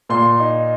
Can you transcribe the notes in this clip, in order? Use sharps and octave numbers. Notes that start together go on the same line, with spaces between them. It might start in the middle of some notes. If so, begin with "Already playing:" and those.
A#2 C6
D#4